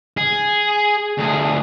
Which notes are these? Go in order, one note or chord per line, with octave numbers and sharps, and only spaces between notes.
G#4
D2 G#4